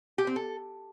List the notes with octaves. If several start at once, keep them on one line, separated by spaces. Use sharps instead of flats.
G4
C4
A4